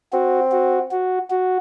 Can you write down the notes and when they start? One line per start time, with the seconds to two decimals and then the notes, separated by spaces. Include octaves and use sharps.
0.13 C4 F#4
0.52 F#4
0.91 F#4
1.30 F#4